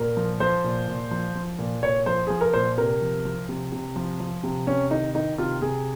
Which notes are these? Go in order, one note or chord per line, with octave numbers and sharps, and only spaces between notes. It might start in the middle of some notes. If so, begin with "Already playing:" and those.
Already playing: A#2 A#4
F3
F3 C5
A#2
A#2
F3
F3
A#2
A#2 C#5
F3 C5
F3 G#4
A#4
A#2 C5
C3 A#4
F3
F3
C3
C3
F3
F3
C3
C3 C#4
D#3 D#4
D#3 D#4
C3 F4
C3 G#4